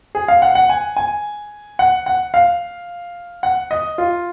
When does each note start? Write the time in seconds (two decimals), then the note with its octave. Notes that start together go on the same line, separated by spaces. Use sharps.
0.15 G#4
0.28 F5
0.42 F#5
0.55 F#5
0.69 G#5
0.97 G#5
1.79 F#5
2.06 F#5
2.34 F5
3.43 F#5
3.71 D#5
3.98 F4